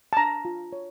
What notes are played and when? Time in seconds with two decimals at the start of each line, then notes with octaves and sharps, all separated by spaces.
0.13 A5
0.17 D4 A#5
0.45 F4
0.73 C#5